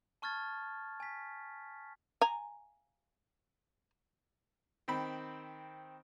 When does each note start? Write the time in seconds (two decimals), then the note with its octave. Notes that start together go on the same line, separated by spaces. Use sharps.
0.22 A5 C#6 F6 G#6 A6
1.00 G#5 B6
2.21 G#5 A#5
4.88 D#3 C4 B5